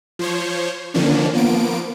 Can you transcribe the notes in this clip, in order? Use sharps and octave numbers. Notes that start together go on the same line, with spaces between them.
F3 C5 C#5
D3 D#3 F3 A#3 C#4 D4
F3 A#3 B3 D7